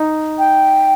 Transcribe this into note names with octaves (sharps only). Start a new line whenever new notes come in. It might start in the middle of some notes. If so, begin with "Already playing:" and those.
Already playing: D#4
G5